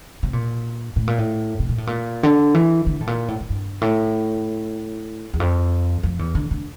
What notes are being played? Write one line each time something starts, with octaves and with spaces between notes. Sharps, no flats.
C3
A#2
A2
A#2
A2
C3
A#2
A2
A#2
D3
E3
D3
A2
A#2
A2
A2
G2
A2
E2
F2
F2
E2
D3
D3